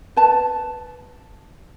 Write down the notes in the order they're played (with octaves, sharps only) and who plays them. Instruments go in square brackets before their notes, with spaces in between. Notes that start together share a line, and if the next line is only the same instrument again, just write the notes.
[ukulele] B4 A5